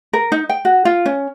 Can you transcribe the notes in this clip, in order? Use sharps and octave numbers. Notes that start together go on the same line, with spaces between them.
A#4
D#4
G5
F#4
F4
C#4